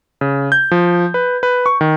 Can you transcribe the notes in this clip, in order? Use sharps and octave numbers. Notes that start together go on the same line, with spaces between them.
C#3
G6
F3
B4
B4
C#6
D#3